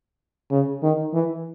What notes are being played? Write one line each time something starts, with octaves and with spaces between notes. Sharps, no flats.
C#3
D#3
E3